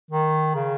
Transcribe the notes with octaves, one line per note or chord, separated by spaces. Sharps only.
D#3
C#3